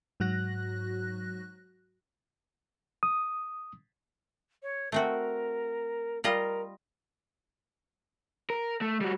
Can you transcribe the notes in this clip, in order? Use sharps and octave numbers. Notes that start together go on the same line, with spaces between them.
G#2 F#3 F#4 F#6 A#6
D#6
C#5
A3 C4 F#4 A#4
G3 F4 A#4 D#5
A#4
A3
G3 F#4